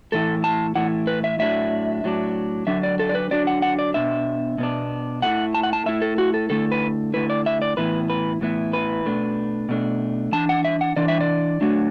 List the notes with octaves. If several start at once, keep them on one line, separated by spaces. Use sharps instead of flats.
A2 E3 A3 E4 A4
A5
A2 E3 A3 E4 F#5
B4
E5
A2 F#3 D4 E5
A2 F#3 D4
D3 F#3 D4 E5
D5
A4
D5
B4
D3 F#3 D4 D5
F#5
F#5
D5
B2 B3 D4 E5
B2 B3 D4
A2 A3 E4 F#5
A5
F#5
A5
A2 A3 E4 E5
A4
F#4
A4
D3 A3 E4 A4
B4
D3 A3 E4 B4
D5
E5
D5
A2 E3 B3 E4 B4
B4
A2 E3 B3 E4
B4
B2 A3 D4
B2 A3 D4
E3 D4 A5
F#5
E5
F#5
E3 D4 D5
E5
D5
D3 F#3 A3 D4